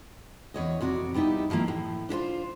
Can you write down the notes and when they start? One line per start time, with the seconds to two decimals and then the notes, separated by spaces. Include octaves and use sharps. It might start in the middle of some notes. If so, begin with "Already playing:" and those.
0.54 E2 C#5 D#5
0.81 F2 C3 F#4 D5
1.14 G3 B3 D#4 E4 G4
1.50 D#3 F3 A3 A#3 E4
1.68 A2
2.09 D4 E4 F4 C5